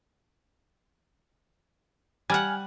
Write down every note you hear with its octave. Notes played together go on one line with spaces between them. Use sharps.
G3 F#5 G#5 F6